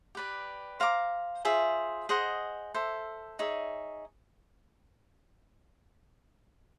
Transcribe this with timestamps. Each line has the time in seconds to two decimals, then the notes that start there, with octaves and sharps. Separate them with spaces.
0.15 G4 B4 D5
0.80 C5 F5 A#5 D6
1.45 F4 G#4 C5 E5
2.09 G#4 C5 D#5 F#5
2.74 A4 C5 E5
3.39 D#4 G#4 C#5 E5